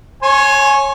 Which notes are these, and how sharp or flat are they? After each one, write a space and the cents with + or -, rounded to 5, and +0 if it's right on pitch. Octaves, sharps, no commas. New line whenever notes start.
C#5 -15 G#5 +15 C6 +30